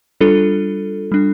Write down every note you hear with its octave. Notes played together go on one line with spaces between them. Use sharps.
G3 D4 F4 A4
G3 D4